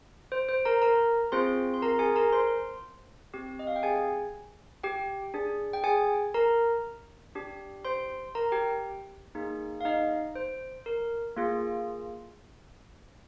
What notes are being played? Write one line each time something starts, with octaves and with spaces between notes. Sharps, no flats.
C5
C5
A#4 A#5
A#4 A#5
C4 F4 G#4 C5 C6
C6
A#4 A#5
G#4 G#5
A#4 A#5
C5 C6
C4 G4
D#5
F5
G5
G#4 G#5
G4 G5
D4 G#4
G5
G#4 G#5
A#4 A#5
D4 G4
C5 C6
A#4 A#5
G4 G5
A#3 D#4 G#4
F5
D#4 D#5
C5
A#4
A#3 F4 G#4